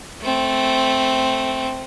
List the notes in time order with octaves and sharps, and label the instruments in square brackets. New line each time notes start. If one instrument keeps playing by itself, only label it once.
[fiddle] A3 C4